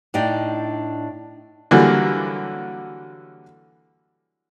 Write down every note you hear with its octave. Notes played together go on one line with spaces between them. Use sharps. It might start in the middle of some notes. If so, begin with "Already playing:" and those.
A2 D4 D#4 D5 G5
D3 E3 F#3 G3 A#3